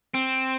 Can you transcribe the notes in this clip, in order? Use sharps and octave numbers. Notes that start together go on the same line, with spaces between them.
C4